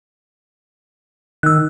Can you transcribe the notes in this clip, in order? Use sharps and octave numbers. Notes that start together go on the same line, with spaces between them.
D#3 E6 F#6